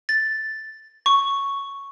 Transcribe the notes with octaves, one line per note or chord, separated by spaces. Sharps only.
A6
C#6